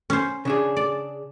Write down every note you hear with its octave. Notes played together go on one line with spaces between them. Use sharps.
C#4 C5
C#3 D4 G#4
D5